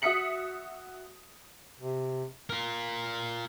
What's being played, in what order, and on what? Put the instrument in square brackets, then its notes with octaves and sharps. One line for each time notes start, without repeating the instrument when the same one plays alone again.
[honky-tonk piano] F#4 E5 D#6 B6 C#7 F#7
[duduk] C3
[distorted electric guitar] F4 A#4